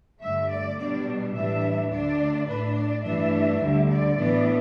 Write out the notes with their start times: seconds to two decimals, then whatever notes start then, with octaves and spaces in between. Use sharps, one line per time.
0.20 G2 D3 A3 E5
0.49 D5
0.77 B2 G3 D4 D5
1.33 A2 E3 G3 D4 E5
1.90 D2 D3 A3 D4 D5
2.47 A2 A3 D4 B4
2.76 D5
3.04 G2 E3 A3 D4 E5
3.60 D2 D3 G3
3.89 D5
4.17 A2 E3 B3 D4